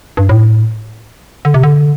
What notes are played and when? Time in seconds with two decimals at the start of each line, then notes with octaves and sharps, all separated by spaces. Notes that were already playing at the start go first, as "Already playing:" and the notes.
0.17 G2
0.29 A2
1.45 D3
1.54 C3
1.63 D3